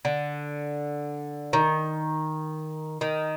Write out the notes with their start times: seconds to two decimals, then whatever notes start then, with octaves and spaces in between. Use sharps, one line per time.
0.05 D3
1.53 D#3
3.01 D#3